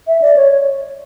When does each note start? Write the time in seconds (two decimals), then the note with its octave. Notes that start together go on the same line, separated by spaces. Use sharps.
0.07 E5
0.22 D5
0.36 C#5